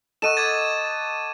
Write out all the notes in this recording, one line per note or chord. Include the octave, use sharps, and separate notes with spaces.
A4 D#5 F#5 C#6 D#7 E7
D6 G#6 A6